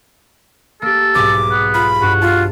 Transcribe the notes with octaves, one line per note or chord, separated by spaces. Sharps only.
A#3 G4 A4
B1 G#2 D6
B3
F4 B5
G2 F#4
F4 A5